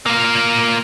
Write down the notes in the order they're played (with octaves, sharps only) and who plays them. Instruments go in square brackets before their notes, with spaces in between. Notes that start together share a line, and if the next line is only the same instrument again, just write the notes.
[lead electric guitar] A#3 F4